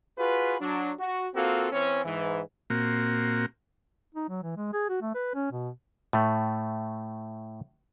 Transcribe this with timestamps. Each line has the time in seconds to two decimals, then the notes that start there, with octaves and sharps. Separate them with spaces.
0.18 F4 F#4 G#4 B4
0.60 F#3 D4
0.99 F#4
1.34 A#3 C4 F4 F#4 A4
1.72 E3 C4 C#4
2.04 G#2 E3
2.70 A#2 A#3 C4 F#4
4.14 D#4
4.29 F#3
4.43 E3
4.56 G#3
4.73 G#4
4.89 F#4
5.01 A3
5.15 B4
5.35 C#4
5.52 B2
6.13 A2 A3